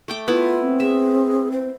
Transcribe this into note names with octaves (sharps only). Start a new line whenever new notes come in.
A3 G5 D6
B3 E4 F4
C4
G#4 E5
C5